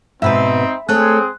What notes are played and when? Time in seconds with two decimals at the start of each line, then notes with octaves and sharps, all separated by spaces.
0.22 G#2 B2 C4 D#4 B4 E5 B5
0.89 A3 C4 G#4 A4 C#5 F#6